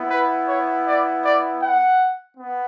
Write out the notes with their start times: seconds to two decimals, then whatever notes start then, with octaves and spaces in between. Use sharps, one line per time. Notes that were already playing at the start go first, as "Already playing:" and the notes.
Already playing: B3 E4
0.10 B4
0.47 C#5
0.86 D5
1.23 D5
1.61 F#5
2.37 B3